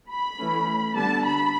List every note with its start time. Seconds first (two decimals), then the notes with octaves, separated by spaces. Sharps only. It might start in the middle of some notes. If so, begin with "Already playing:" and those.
0.09 B5
0.39 E3 A3 C#4
0.94 D3 G3 B3 D4 A5
1.24 B5